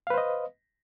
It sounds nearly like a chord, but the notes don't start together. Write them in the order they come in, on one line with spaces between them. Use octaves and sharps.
F5 B4 C5 D#5